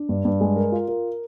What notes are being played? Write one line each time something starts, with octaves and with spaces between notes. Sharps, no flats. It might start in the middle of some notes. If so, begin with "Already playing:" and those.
Already playing: D4
G2
G2
G#3
A#4
F4
A#4